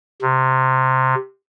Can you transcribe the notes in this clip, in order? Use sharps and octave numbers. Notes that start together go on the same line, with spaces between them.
C3